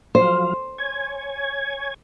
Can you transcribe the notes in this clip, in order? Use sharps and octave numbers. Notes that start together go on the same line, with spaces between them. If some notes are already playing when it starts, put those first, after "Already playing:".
F3 F#3 C5 F5
C#5 G#5 G#6